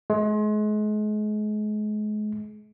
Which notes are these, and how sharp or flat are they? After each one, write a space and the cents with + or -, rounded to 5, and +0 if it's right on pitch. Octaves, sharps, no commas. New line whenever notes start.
G#3 +35